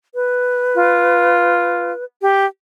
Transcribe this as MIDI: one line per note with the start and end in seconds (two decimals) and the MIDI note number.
0.15 2.04 71
0.75 1.92 65
2.22 2.46 67